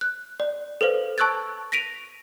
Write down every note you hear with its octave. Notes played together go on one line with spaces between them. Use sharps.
F#6
D5
A4 B4 C5 F5
A5 C#6 E6 F#6 G#6 A6
A#6 B6 D7 D#7 F7